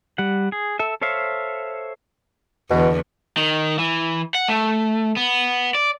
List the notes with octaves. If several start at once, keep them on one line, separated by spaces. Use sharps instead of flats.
G3 F#5
G#4
A4 E5
A4 C5 C#5 E5 F5
E2 B2 D3
D#3
E3
F#5
A3
B3
D5